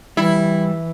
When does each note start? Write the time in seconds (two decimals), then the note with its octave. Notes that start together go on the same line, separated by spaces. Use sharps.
0.17 E3 G3 E4